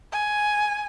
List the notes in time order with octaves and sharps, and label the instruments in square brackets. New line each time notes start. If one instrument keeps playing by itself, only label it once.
[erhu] G#5